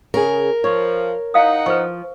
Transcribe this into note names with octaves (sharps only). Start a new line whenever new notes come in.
C#3 G#4 A#4
F3 C#5
D#4 E4 F5 F#5 D#6
F3 B4 C5 C#6